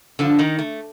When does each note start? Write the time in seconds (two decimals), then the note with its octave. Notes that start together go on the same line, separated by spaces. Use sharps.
0.19 G2 D3 F3 D4
0.39 D#3 D#4
0.59 A3